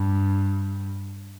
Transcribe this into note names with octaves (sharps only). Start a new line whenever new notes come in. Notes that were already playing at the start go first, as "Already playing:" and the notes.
Already playing: G2